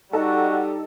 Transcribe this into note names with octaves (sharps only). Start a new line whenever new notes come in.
G3 D#4 F#4 A4 D#5 A#5